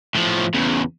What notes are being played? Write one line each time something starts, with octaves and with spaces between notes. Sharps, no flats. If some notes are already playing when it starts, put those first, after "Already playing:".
A2 F3
E2 C#3